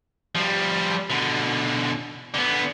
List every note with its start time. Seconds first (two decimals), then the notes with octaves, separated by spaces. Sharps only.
0.35 F3 G3
1.10 B2 D3
2.34 D3 B3